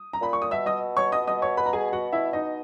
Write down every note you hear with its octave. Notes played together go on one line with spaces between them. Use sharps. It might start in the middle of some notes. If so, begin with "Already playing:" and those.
Already playing: D#6
A#5
A#2 B5
C#6
D#6
B2 E5 E6
D#5 D#6
C#5 C#6
D#5 D#6
D#5 D#6
C#5 C#6
B4 B5
A#5
G#4 G#5
F#4 F#5
E4 E5
D#4 D#5